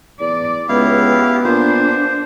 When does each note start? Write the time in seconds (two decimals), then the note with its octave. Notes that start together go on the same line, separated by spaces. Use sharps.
0.20 E2 D5
0.69 C#2 B3 E4 G4 F5
1.45 A#2 D4 C5